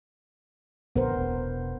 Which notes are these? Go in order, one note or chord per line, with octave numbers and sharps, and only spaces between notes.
A#1 D3 B3 A#4 C5
E1